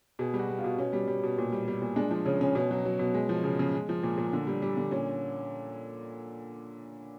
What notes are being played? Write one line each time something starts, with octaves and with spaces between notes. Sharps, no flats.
B2 G#4
G3
F#4
G3
F4
B2
B2 C#4
G3
G3
B2
A#2
G3
G3
A#2
G#3 D4
F3 D4
C#3 C#4
C#3 C#4
B2 C#4
F#3
F#3
B2
G#3
F3
C#3
C#3
G#3
F3
A#2
A#2
D3
G3
G3
D3
A#2 C#4